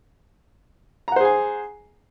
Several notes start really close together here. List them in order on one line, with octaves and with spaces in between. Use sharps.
A#5 F#5 C5 G#4 G#5